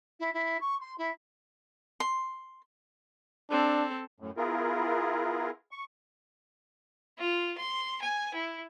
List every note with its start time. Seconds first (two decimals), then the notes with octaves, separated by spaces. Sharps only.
0.20 E4
0.34 E4
0.61 C#6
0.80 C6
0.98 E4
2.00 C6
3.51 C4 D4 A4
4.20 F#2 A2
4.37 B3 E4 F4 G#4 A#4
5.71 C#6
7.19 F4
7.58 C6
8.02 G#5
8.35 E4